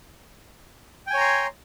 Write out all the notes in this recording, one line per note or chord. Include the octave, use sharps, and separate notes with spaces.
C#5 G5 G#5 A#5 C6